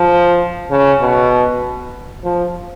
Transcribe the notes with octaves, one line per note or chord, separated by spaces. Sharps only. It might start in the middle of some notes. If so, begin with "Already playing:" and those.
Already playing: F3
C#3
B2
F3